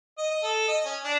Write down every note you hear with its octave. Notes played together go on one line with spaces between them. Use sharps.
D#5
D#5
A4
D#5
C#4
D4